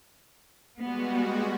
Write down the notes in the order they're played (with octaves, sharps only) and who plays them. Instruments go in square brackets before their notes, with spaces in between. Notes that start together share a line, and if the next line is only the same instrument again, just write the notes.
[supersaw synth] G3 G#3 F#4 [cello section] B3